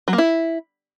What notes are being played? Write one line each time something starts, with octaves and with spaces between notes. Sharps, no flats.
F#3
A#3
E4